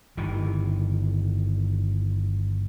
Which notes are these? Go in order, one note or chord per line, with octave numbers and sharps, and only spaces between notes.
G1 D#3 E3